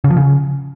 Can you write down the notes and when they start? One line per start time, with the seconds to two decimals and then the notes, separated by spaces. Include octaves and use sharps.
0.04 C#3
0.10 F3
0.17 C#3